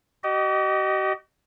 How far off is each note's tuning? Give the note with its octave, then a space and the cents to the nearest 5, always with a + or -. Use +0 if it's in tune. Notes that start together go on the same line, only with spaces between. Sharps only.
G4 -45 D#5 -15